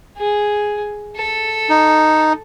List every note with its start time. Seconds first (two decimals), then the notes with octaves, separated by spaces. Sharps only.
0.18 G#4
1.16 A4
1.70 D#4